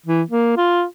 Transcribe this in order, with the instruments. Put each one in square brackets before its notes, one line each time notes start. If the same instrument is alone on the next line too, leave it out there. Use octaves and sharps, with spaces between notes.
[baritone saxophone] E3
A#3
F4